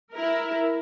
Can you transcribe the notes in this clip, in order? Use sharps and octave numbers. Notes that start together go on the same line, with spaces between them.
E4 A#4